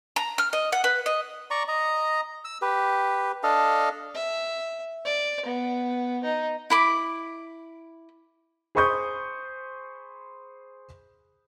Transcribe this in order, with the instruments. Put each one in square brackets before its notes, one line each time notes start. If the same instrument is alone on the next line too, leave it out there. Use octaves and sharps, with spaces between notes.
[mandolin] A#5
F6
D#5
F#5
B4
D#5
[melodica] D5 A#5 C#6
D#5 A#5
E6
G4 B4
D4 A4 D#5 F5
[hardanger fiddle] E5
D5
B3
D#4
[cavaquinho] E4 B5 D6
[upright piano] G#4 C5 B5 C#6 D#6 G6